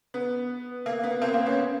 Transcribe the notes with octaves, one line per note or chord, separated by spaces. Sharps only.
B3
A#3
B3
A#3 C4
B3
A#3 C4
B3 C#4